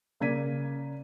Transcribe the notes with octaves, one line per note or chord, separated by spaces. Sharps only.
C#3 A#3 D5 G#6 B6 D#7